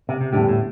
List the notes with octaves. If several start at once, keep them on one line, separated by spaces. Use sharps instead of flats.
C3
C3
E2 A2 D3 G3 D4 G4
A2